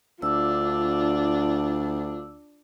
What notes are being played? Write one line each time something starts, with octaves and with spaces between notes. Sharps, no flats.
D2 D4 F4 D6 E6